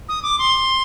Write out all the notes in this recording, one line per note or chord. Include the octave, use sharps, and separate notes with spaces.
D#6
D6
C6